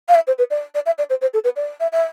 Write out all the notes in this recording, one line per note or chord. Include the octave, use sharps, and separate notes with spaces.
F5
E5
C5
B4
D5
D5
E5
D5
C5
C5
A4
B4
D5
E5
E5